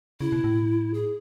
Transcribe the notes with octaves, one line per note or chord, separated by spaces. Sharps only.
C#3 E4
B2
A2
G#4